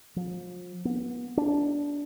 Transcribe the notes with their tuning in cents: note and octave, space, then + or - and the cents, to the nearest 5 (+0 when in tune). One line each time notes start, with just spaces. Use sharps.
F3 +35
B3 -30
D4 -20